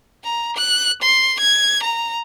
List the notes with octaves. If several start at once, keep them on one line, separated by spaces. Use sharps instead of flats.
A#5
F#6
C6
G#6
A#5